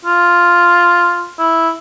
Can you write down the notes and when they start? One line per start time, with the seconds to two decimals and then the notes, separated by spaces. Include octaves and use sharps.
0.05 F4
1.39 E4